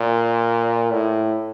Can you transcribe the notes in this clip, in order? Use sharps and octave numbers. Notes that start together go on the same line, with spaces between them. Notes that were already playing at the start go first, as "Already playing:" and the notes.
Already playing: A#2
A2